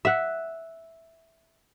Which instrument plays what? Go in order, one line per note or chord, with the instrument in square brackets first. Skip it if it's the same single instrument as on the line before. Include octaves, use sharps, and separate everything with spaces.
[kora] E5 F#5